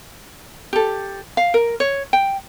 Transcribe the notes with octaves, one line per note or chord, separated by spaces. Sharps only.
G4 A4
F5
A#4
C#5
G5